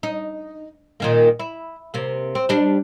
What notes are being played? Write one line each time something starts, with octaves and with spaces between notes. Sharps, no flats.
D#4
A#2 D#3 A#3
E4
C3 A#3
C4
G3 D4